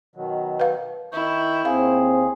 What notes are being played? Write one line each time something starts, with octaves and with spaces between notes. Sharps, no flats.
B2 D#3 F#3
B4 F5
D#3 E4 C#6 G6
D#2 C4 G#4 F5